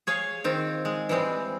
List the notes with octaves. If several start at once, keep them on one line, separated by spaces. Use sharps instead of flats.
G#4 C#5 F5 G#5
D#3 C4 F4
G#3
E3 G3 G#3 C4